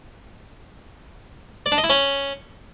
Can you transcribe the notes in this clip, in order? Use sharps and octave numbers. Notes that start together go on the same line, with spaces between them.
D5
D4
D#5
E4
C#4